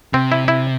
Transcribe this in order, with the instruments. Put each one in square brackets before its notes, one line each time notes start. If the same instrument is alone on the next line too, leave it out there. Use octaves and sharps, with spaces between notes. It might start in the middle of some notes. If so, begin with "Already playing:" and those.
[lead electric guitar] C3 [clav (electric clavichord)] C4
[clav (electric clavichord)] E4
E4